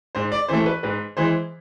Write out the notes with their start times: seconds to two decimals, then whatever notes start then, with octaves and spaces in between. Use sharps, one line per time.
0.15 G#2 C5
0.32 D5
0.48 E3 A3 C5
0.66 B4
0.83 G#2 B4
1.17 E3 G#3 C5